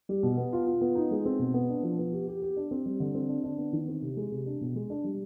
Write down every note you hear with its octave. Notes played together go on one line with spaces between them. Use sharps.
G3
B2
B3
F4
F4
B3
D#4
G#3
C4
B2
B3
D4
F3
B3
G4
G4
G4
D4
C4
G3
D3
C4
D4
D4
B3
D#3
C4
C3
G#3
C3
D4
B2
G#3
D4
G3